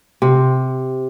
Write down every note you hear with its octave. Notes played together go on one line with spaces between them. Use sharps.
C3